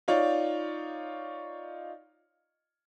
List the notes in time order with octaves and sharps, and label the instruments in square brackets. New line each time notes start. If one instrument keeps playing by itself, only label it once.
[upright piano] D#4 F4 C#5 D5